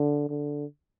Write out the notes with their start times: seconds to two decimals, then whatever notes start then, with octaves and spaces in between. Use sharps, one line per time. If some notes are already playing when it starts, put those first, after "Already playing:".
Already playing: D3
0.30 D3